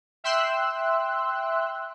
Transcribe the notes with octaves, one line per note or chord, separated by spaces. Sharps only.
E5 G5 C6 E6 F#6